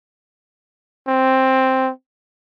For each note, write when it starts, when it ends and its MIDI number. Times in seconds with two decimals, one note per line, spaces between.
1.08 1.91 60